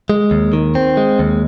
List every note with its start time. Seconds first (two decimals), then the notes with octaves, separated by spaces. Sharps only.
0.10 G#3
0.31 D#2
0.53 D#3
0.75 C4
0.97 G#3
1.19 D#2